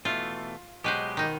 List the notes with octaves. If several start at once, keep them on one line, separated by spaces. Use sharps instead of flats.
B2 E3 A3 F4
B2 F#3 G#3 G4 B4 C5
D#3 D#4